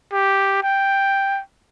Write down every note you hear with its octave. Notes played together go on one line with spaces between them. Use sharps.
G4
G5